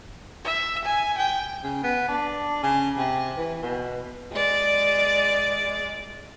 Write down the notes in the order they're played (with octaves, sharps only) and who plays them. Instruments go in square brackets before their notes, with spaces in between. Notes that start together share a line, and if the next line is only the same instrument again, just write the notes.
[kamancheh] E5
G#5
G5
[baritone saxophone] C#3
B3
D4
C#3
C3
E3
B2
[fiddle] G#3 D5